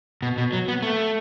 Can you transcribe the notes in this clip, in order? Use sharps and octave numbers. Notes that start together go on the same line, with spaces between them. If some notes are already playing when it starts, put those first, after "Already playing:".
B2
B2
F#3
B3
A3